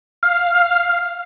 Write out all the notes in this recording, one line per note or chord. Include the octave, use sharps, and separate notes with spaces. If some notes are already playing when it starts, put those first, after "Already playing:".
F5